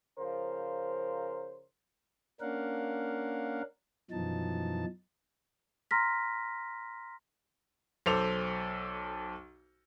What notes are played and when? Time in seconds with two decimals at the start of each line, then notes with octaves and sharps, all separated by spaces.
0.18 C#3 F3 A#4 C5
2.41 A#3 C#4 D4 A#4 F5 F#5
4.11 F#2 B2 E3 F3 D#4 A5
5.91 A#5 C6 F6 A#6 B6
8.06 B1 A4 C5 D6 F7